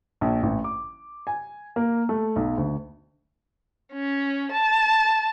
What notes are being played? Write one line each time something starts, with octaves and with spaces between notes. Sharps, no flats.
A#1
A1
D6
G#5
A#3
A3
B1
D2
C#4
A5